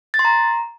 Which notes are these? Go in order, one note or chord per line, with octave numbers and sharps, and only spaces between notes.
A6
C6
A#5